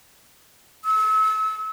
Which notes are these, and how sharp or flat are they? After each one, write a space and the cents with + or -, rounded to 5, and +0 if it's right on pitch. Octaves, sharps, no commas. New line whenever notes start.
E6 -35